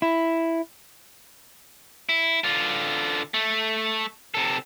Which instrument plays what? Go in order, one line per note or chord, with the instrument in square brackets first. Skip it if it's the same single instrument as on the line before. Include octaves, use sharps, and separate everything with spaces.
[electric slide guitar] E4
[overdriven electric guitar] E4
D3 F4
A3
C3 A4